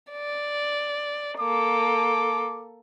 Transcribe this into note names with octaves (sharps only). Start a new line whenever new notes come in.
D5
A#3 A4 D6